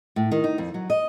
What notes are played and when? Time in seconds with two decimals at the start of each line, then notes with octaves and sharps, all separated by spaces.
0.16 A2
0.32 D#3
0.44 D#4
0.58 F2
0.74 F#3
0.90 D#5